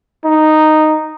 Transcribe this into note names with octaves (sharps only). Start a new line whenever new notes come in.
D#4